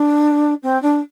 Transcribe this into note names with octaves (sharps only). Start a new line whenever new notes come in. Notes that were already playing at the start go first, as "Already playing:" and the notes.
Already playing: D4
C4
D4